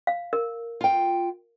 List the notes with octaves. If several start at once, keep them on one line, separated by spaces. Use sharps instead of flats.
F5
A#4
F4 G5